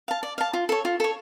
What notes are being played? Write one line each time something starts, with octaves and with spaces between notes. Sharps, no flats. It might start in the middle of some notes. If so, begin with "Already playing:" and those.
F5 A5
D5
F5 A5
F4
A4 C#5
F4
A4 C#5